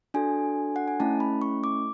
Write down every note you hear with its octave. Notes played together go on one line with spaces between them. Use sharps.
D4 F#4 A4 G#5
F#5
G#5
A3 C#4 E4 A5
B5
C#6
D6